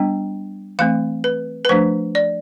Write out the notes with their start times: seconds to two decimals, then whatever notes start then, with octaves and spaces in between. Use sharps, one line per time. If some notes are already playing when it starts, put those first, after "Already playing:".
Already playing: G3 B3 D4 G5
0.79 E3 A3 C4 F5
1.24 B4
1.65 B4
1.69 F3 A3 D4 C5
2.15 D5